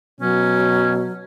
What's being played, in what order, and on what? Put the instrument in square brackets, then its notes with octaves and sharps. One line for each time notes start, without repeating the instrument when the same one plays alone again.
[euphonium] B2 [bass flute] F#3 [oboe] C#4